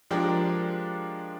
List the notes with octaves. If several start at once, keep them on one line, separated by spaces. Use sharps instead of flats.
F3 G#3 D4 G4 A#4